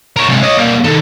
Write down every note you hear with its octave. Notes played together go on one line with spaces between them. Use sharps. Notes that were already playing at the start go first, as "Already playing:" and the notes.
A#4 C#5
C3 G#3
C#5 D#5
G3 A#3
D#3 A4